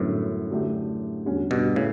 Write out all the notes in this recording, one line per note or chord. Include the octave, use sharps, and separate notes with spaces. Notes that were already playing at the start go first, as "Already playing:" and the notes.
Already playing: F#2 A2 D3 G3 B3
D3 F#3 A3 D4 G4
E2 D3 G3 C#4 F#4
G2 B2
A2 C#3